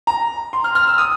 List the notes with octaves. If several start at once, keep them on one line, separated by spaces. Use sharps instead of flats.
A#5
C6
F6
F6
E6
D#6